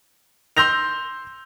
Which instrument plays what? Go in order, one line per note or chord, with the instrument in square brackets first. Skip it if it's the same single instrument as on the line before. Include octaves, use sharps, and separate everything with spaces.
[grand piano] C6 E6 G6 A#6 F7